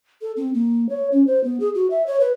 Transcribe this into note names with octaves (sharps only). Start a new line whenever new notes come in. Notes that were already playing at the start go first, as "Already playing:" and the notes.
A4
C4
A#3
C#5
C#4
C5
B3
G#4
F#4
E5
C#5
B4